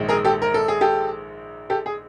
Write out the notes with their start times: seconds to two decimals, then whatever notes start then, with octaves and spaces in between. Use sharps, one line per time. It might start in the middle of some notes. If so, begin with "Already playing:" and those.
Already playing: A#1 G#2 D#3 G#3
0.09 G#4 A#4
0.25 G4 A4
0.42 A#4
0.54 A4
0.68 G#4
0.81 G4 A4
1.70 G4 A4
1.86 G#4